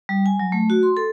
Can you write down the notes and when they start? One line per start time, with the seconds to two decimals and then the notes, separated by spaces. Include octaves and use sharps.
0.09 G3
0.26 G#5
0.39 F#3
0.52 A3
0.70 F#4
0.83 C6
0.97 A4